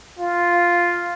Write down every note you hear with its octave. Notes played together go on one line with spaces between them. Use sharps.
F4